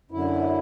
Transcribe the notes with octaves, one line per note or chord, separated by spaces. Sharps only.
F#2 D3 E4